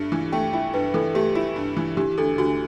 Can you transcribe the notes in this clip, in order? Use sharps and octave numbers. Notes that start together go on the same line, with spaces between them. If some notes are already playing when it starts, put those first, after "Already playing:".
Already playing: G2 A3
E3
A3 G5
E4 G5
G2 B4
E3 A4
A3 G4
E4
G2
E3
E3 G4
D2 A4
D2 F#4